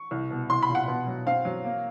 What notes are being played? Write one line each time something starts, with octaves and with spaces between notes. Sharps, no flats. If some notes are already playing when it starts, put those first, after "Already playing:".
Already playing: C#6
C2
B2
C2 C6
B5
A#2
F#5
B2
F#3
C4 F5
F#3
A#3